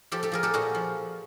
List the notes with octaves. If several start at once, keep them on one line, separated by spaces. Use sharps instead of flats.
F3 G4 A4
G4 A4
F3 G#4 A#4
G4 A4
A#2 F#4 G#4
F3